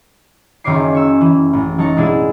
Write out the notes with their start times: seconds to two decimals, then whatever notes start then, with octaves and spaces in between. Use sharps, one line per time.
0.64 F#1 F#2 D#3 C#5 D6 C7
0.95 C#6 E6
1.21 E3
1.53 A1
1.78 F#3 D#4 A5 C#6
1.97 B2 G#3 D4 E4 G#4